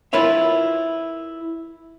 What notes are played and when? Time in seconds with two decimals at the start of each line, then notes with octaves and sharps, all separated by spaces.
0.13 E4 F4 A#4 B4 C#5 E5